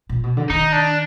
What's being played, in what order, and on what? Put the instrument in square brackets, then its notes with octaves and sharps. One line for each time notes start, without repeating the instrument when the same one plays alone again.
[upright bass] A#2
B2
D3
[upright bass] D#3 [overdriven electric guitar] D#4
[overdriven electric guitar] D4